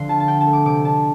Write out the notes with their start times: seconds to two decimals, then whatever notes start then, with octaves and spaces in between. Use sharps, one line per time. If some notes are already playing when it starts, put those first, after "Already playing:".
Already playing: D3 F3 C4 C6
0.08 F4 A5
0.20 A5
0.27 D4 G5
0.40 A5
0.47 A3
0.53 D6
0.65 C3 D6
0.84 D4 A5